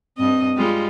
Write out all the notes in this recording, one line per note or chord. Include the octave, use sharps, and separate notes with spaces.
G2 C4 D#5
G3 G#3 F4